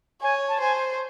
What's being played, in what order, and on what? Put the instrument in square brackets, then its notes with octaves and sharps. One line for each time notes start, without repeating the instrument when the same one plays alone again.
[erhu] C#5 [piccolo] G#5
[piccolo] A5
[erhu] C5 [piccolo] G#5